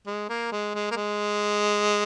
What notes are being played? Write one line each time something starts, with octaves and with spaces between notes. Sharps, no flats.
G#3
A#3
G#3
G#3
A#3
G#3